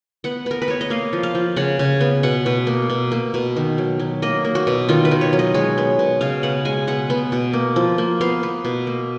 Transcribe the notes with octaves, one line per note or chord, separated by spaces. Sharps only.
B3 F#5
B3 A#4
B4
B3 C#5
D#5
A#3 F5
F3
F5
F3
C#3 F#5
C#3
B3
B2 F#5
B2
A#3
B2
A#3
B2
D#3
F#3
F#3
A#3 D#5
A#3
F#4
B2
D#3 F4
B4
D#3
C#5
F#3
D#5
G#3 C#5
B3
B2
C#3 F5
B3 F#5
G#3 G#5
B2 F#5
B3
B2
A#3
F3
A#3
B3 F5
B3
B2
A#3